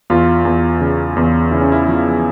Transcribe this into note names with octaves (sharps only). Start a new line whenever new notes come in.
E2 F4
E2
C#3
E2
C#3 E4
C#4
E4
F3